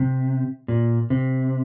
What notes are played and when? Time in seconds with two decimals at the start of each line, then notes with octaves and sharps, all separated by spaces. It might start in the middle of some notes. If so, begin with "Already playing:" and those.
Already playing: C3
0.68 A#2
1.10 C3